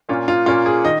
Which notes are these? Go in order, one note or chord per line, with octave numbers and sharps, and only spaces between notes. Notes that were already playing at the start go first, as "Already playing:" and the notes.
A#2 A#3 C#4 F4
F4
A#2 A#3 C#4 F4
G#4
D#3 D#5